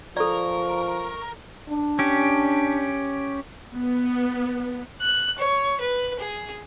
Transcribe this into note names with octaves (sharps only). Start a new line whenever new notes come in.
F3 A4 A#4 D5 C#6
D4
C#4 G4
B3
F#6
C#5
B4
G#4